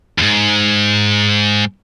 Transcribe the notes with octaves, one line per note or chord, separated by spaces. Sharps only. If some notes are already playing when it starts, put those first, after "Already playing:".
D#2 G#2